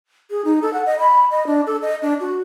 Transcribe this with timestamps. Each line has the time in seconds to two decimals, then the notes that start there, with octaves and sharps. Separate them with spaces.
0.31 G#4
0.45 D#4
0.62 A4
0.73 F#5
0.86 D#5
0.99 B5
1.30 D#5
1.47 D4
1.67 A4
1.82 D#5
2.02 D4
2.20 F#4